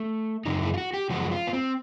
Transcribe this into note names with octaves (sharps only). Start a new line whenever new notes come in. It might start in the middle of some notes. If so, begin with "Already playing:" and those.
Already playing: A3
F#2 C#3 D#4
E4
F4
F#4
G4
F#2 C#3 F3 G#3 F#4
F4
B3
C4